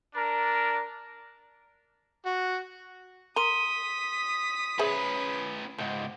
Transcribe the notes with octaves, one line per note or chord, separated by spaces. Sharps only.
D4 A#4
F#4
A#4 C6 D#6 B6 D#7 G7
C#4 G#4 B4 C5 E5
C#2 G#2 F3